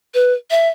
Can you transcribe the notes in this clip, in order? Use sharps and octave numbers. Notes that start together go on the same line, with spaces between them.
B4
E5